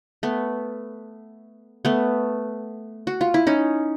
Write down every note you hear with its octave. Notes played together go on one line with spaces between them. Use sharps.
A3 B3
A3 B3
F#4
F4
E4
C#4 D#4